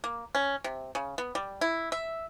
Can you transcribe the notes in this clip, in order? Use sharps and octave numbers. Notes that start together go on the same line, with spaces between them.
A#3
C#4
C3
C#3
B3
G3
E4
E5